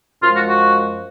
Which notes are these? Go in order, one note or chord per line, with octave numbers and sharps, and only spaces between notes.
F#2 F3 G#3 F4
F#4
F#4